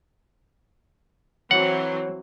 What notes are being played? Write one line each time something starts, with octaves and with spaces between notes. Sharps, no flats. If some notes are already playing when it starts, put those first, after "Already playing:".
E3 F#3 C4 C#5 F#5